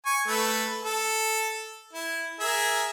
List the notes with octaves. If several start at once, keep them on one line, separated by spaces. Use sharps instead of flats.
G#5 C#6
A3 A4 B4
A4
E4
G#4 A#4 E5